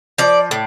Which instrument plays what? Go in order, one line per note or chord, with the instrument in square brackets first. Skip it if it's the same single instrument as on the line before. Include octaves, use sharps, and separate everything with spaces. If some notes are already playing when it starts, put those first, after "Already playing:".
[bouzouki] F3 D5
A2